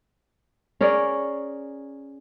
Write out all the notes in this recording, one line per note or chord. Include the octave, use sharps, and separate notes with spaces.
C#4 G#4 A#4 D5